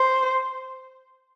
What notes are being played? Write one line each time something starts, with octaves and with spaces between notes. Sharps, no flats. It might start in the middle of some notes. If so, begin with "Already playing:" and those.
Already playing: C5